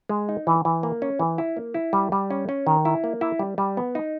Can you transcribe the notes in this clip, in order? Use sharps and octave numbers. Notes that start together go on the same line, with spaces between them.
G#3
D#4
E3
E3
A#3
C#4
E3
E4
A#3
E4
G3
G3
C#4
C#4
D#3
E4
A#3
E4
G3
G3
B3
D#4